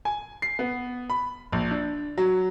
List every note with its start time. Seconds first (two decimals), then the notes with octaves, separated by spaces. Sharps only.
0.05 G#5
0.42 C7
0.59 B3
1.10 B5
1.52 A#1
1.71 D4
2.18 F#3